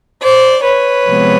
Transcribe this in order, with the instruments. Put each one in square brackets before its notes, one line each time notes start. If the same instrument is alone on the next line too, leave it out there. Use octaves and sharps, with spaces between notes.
[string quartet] C5 D5
B4 C#5
C3 F3 G#3 B3